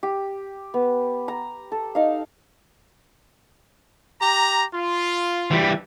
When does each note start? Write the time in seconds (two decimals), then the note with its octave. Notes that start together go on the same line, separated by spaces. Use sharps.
0.03 G4
0.74 B3
1.28 A#5
1.72 A4
1.95 D#4 F5
4.21 G4 A#5
4.74 F4
5.51 E3 G3